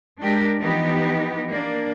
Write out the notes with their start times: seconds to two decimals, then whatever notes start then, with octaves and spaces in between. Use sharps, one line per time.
0.20 G#3 D4 G4 A#4
0.59 E3 F3 B3 D#4 G4
1.49 A#3 D4 D5